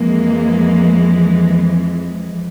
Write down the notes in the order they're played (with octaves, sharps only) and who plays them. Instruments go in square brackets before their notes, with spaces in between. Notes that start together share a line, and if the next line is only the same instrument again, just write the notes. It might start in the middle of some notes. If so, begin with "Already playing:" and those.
Already playing: [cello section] F2 E3 G#3 A#3